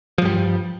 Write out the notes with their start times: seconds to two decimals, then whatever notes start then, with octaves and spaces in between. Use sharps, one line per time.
0.18 F3
0.22 G2
0.25 G3